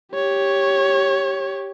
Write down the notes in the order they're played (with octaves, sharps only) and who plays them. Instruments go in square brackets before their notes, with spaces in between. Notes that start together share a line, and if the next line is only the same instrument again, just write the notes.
[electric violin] G4 C#5